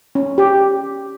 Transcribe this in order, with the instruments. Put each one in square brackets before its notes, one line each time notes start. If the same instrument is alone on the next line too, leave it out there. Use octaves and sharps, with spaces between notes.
[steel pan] C#4
G4